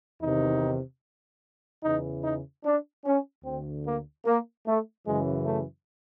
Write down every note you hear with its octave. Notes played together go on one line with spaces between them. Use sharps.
E2 C3 D#3 D#4
E2 C#3 E3 D#4
D#4
D4
C#4
D2 D3 C4
A#3
A#3
A3
F#2 C#3 E3 G#3
A3